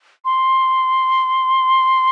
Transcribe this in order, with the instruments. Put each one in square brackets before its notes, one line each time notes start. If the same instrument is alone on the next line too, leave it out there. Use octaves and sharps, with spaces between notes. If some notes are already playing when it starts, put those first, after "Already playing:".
[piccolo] C6